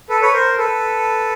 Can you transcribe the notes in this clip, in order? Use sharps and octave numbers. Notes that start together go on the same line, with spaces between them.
A4 B4
B4 C#5
A#4 C5
A4 B4